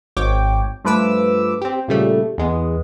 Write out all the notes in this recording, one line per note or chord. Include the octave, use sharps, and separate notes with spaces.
G#1 G#2 C#5 G5 D6
G2 F3 A3 B4 D6 E6
C4 G4
A#2 C#3 G3 A3
E2 G#3 B3